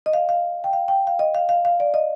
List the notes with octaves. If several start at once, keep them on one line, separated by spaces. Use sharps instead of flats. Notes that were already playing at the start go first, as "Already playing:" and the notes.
D#5
F5
F5
G5
F5
G5
F5
D#5
F5
F5
F5
D5
D#5